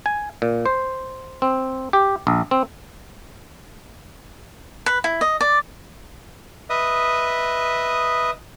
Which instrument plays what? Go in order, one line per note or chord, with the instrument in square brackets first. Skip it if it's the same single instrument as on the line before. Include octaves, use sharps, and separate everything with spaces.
[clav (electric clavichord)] G#5
A#2
C5
C4
G4
A#1
C4
[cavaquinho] B4
E4
D#5
D5
[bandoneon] B4 D#5 E5 D#6